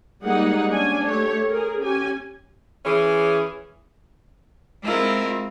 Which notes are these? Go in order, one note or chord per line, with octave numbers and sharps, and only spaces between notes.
G3 G#3 A#3 D#4 G#4 F#5
C#4 D4 G#5
A3 G4 C#5
G#4 A#4
C#4 G4 G#5
E3 C#4 E4 G#4
G#3 C4 E4 F4 A#4